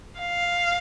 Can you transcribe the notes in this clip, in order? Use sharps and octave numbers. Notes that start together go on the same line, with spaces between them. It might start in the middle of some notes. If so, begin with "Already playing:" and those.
F5